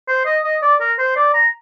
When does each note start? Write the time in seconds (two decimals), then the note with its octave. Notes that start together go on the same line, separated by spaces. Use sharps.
0.08 C5
0.25 D#5
0.44 D#5
0.62 D5
0.80 A#4
0.98 C5
1.16 D5
1.34 A#5